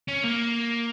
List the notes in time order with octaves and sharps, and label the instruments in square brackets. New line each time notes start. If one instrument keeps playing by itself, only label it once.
[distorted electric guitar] C#4
A#3